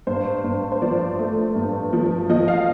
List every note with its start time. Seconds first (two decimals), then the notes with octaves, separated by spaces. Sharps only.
0.07 G2 C5
0.44 G2
0.72 C5
0.82 F3 D5
1.19 A3
1.55 G2
1.93 F3
2.30 F3 D#5
2.48 F5